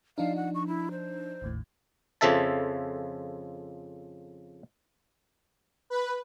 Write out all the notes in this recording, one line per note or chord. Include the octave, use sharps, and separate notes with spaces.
F3 D4 D#4 F5
F#5
C#6
E4
C5
G#1 D#2 A2
F2 C#3 F3 A4 E5 A5
B4